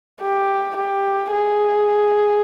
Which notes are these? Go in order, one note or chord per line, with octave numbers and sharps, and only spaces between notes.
G4
G4
G#4